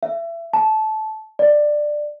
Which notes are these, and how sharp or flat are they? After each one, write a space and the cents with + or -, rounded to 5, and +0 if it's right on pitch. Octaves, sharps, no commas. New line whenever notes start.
E5 +30
A5 -20
D5 +15